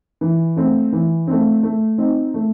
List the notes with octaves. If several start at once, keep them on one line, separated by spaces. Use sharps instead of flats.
E3
A3 C4
E3
A3 C4
A3
C4 D#4
A3